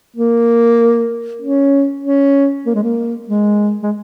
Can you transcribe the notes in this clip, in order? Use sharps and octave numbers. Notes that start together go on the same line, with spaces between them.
A#3
C#4
C#4
A#3
G#3
A#3
G#3
G#3